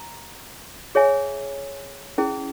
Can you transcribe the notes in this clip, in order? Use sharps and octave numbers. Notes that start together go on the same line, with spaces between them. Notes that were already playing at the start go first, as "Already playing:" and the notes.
Already playing: A#5
G#4 C#5 E5 G#5
C#4 E4 G#4